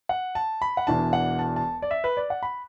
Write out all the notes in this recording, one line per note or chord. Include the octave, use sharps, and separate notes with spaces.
F#5
A5
B5
F#5
E1 E2 E3 D4 A5
F#5
A5
A5
D5
E5
B4
D5
F#5
B5